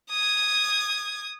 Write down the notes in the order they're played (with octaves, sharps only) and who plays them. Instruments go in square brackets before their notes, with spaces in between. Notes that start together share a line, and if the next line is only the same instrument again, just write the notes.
[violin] D#6 G#6